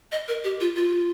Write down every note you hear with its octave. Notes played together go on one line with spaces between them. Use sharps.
D#5
A#4
G4
F4
F4